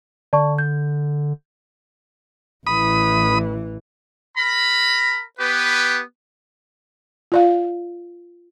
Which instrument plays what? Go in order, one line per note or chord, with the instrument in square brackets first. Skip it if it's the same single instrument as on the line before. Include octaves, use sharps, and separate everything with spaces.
[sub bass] D3 [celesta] D5 A5 C#6
[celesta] G6
[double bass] A1 E3 [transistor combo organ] B5 D#6
[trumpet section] A#4 A#5 B5
B3 G4 B4
[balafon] F4 D5 F5